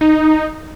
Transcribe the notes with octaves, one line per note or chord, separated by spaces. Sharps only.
D#4